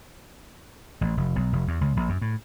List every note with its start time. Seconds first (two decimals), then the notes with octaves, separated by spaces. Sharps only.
1.01 A1
1.17 F1
1.36 B1
1.53 F1
1.68 E2
1.81 C#2
1.97 A#1
2.09 F#2
2.22 A2